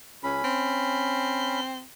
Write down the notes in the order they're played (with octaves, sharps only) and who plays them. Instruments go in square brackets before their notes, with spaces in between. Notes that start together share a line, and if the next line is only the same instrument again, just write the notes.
[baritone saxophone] C#2 [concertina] C#4 B5
[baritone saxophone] C4